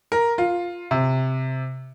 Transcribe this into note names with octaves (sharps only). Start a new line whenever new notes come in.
A#4
F4
C3